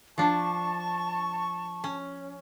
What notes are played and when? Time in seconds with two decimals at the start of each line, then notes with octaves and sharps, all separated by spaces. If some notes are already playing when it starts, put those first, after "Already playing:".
0.18 F3 D4 A5 C#6
1.84 C#4